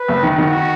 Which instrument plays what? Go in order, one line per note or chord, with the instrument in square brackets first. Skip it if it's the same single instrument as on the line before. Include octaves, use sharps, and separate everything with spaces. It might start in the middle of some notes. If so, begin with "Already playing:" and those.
Already playing: [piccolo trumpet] B4
[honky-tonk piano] F#1
D#3
[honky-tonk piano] D#3 [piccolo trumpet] F#4